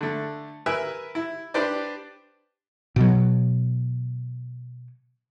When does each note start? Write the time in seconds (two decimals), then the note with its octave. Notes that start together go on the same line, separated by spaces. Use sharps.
0.01 D3 A3
0.66 A#4 B4 E5 G#5 E6 F#6
1.15 E4
1.54 D4 G4 B4 C5 D5
2.96 B2 F#3